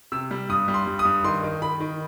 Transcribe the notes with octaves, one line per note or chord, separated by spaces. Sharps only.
C3 E6
G3
G2 D#6
G3
C6
G2
D#6
G2
D#3 C6
D#3
D#3 B5
D#3